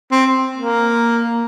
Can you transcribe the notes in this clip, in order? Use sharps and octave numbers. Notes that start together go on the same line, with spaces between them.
C4
A#3